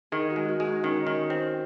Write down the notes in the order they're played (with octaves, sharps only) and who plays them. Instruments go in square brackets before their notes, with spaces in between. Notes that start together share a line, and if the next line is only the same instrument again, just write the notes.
[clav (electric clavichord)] D#3 [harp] G#4
[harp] F#4
[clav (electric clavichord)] G#3
[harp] F#4
[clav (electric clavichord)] G#3
[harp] D#4
[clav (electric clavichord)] D#3 [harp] C#4
[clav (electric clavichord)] D#3
C4